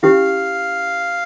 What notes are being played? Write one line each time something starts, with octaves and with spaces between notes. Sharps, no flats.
C#4 E4 G4 F5